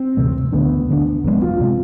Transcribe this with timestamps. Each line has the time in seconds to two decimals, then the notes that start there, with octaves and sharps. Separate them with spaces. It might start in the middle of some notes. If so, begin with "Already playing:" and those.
Already playing: C4
0.17 D2 C3 E3 A3
0.52 D2 D3 A3 B3 D4
0.89 D2 D3 A3 D4
1.24 F1 F2 C3 G#3 B3
1.42 F4
1.60 C3 G#3